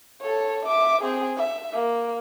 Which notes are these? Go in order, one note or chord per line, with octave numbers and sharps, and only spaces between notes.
A4 C#5
E5 D6
C4 G#4
E5
A#3